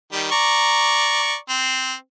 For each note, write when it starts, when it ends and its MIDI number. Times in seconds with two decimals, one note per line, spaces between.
0.13 0.31 51
0.13 0.31 55
0.32 1.35 74
0.32 1.35 82
0.32 1.35 85
1.49 1.94 60